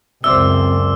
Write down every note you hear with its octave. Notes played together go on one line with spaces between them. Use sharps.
C#2 F#2 C4 C5 D5 E5 E6